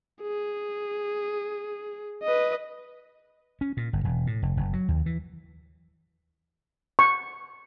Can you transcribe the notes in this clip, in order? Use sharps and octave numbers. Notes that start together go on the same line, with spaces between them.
G#4
B4 D#5
C#4
A#2
G1
E1
A2
F1
F#1
F#3
D#2
E3
C#6